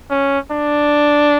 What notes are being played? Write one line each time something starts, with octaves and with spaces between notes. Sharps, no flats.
C#4
D4